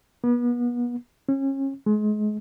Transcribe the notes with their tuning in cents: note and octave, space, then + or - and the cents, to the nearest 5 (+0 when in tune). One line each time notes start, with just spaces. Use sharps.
B3 -35
C#4 -30
G#3 +30